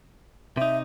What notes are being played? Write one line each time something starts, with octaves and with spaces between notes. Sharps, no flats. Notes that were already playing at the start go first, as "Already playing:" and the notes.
C3 D#4 E5